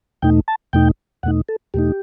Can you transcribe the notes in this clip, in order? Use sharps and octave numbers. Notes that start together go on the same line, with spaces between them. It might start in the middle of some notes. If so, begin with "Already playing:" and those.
E2 B2 A3 D#4 G5
A5
E2 B2 A3 D#4 G5
E2 B2 A3 D#4 F#5
A4
E2 B2 A3 D#4 G4